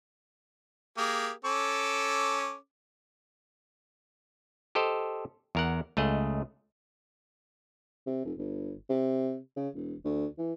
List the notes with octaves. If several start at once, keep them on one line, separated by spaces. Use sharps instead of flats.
A#3 G4 G#4
C#4 A4 D6
G4 A4 C5 D#5
E2 A#4 F#5
C#2 A3 G#4 D#5
C3
F1
G1
C3
C#3
E1
D2
E3